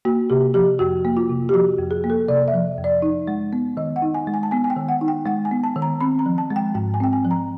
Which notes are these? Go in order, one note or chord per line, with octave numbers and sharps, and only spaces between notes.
A#3 F#4
C3 G4
F3 G4
F2 F#4
A#3
F4
C3
G4
F3 F#4
F2
G#4
A#3
A4
C3 D5
E5
F3
F2
D5
D#4
G#3
B3
D#3 D#5
F#5
D#4
G#5
G#3
G#5
A5
B3 G#5
G#5
G5
D#3
F#5
D#4
G5
G#3 F#5
G#5
B3
A5
D#3
A#5
C4 B5
A#5
F3
A5
G#3
G5
G#2 G5
G#5
C4 G5
G#5
F3
A#5